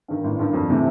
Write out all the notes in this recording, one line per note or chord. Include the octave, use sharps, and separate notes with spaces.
G2 D#3
A1
G2 D#3
F2
C3 E3 A3